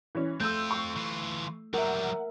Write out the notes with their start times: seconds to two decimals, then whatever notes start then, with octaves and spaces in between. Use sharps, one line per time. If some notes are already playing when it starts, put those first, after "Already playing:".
0.15 E3 C#4
0.40 A3 C4 F4 E6 G6
0.71 C#6
0.96 E3 F4
1.74 F#3 G3 A#4 E5 F#5